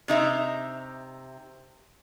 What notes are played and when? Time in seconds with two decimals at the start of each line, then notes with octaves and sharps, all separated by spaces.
0.08 C3 D#4 E5